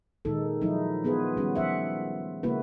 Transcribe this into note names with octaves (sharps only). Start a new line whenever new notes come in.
A#2 D#3 G#3 D#4 A4
D#3 F3 F#3 G#3 D#4 E4
B3 F4 G#4 B4
D#3 G3 C#4 F#4
F3 C5 E5 F#5
C#3 G#3 A#3 E4 F#4 B4